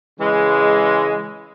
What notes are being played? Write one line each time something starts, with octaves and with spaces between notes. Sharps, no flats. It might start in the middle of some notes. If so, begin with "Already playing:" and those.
C#3 E3 G#3